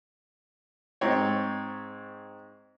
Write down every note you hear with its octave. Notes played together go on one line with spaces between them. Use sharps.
G#2 C4 C#5